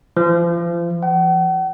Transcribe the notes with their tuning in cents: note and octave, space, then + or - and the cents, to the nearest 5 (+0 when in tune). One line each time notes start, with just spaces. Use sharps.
F3 -35
F#5 +45